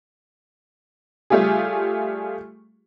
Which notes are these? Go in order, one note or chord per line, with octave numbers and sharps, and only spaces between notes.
G3 A3 F4 G4 G#4